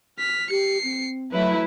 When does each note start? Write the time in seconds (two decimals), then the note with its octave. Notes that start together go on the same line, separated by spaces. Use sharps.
0.19 F6 B6
0.50 G4 C7 C#7
0.84 C4
1.32 F#3 A3 E4 B4